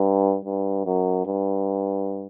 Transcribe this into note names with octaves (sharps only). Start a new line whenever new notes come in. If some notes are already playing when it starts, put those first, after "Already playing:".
Already playing: G2
G2
F#2
G2